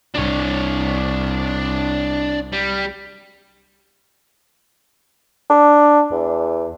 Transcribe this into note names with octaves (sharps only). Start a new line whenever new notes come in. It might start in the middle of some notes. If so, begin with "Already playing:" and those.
C2 D4 C#5
G3
D4
E2